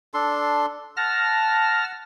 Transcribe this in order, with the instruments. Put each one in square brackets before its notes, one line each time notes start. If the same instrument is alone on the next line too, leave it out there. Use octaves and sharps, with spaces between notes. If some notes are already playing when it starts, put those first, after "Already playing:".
[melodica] D4 A4 C6
[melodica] F#5 [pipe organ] A5 F6 A#6